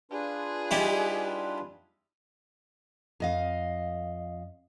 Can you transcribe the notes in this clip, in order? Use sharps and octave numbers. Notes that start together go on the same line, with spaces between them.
D4 F4 G#4 B4
G3 D#4 E4
F2 D#5 F5